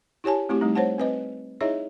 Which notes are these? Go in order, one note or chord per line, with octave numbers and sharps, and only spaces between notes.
E4 G4 C#5 G#5 A5
A3 C4 E4 F#4 G4
G3 A3 D#4
C5 C#5 F#5 A5
C4 B4 D#5
D#4 E4 G#4 C#5 D#5 E5